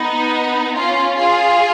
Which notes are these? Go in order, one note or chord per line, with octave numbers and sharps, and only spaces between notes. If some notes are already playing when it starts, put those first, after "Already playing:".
Already playing: B3 D#4
C#4 F4
F4 G#4